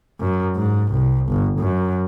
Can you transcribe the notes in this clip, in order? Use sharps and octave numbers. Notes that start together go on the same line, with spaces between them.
F#2
G#2
C2
G1
F#2